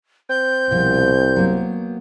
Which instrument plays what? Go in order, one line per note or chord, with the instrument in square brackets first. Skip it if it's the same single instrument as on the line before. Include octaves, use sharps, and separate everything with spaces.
[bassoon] C4 [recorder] G6
[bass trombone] C2 [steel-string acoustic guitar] B2 F3
[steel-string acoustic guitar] F#3 A#3 B3